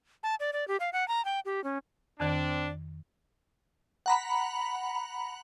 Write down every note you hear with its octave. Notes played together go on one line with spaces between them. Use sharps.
A5
D5
D5
G4
F5
F#5
A#5
G5
G4
C#4
F2 D#3 C4 D4 A5
F#5 A#5 B5